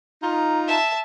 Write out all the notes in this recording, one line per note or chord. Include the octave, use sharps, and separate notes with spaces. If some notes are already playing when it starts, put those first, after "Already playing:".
D#4 F4 A#5
E5 A5